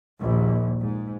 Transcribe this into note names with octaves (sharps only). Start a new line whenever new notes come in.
A#1 D#2
G#2